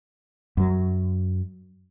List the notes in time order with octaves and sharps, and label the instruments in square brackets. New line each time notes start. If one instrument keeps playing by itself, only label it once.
[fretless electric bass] F#2 F#3